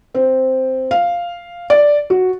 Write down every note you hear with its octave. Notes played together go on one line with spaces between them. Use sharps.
C4
F5
D5
F#4